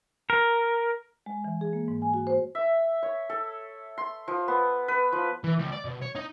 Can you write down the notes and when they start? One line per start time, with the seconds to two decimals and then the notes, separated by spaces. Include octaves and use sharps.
0.30 A#4
1.26 G#3
1.44 E3
1.61 G#4
1.73 A#3
1.88 G#2
2.02 G#5
2.14 F#4
2.27 C5
2.55 E5
3.03 C#5
3.30 A4
3.98 C6
4.28 F3
4.48 B3
4.88 B4
5.12 F3
5.44 E3
5.58 C#2
5.72 D5
5.85 B2
6.01 C#5
6.15 D#4